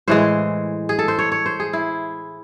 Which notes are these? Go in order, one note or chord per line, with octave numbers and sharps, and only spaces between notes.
A2 E3 G#3 C5
G#4
A4
C5
C#5
C#5
C5
G#4
E4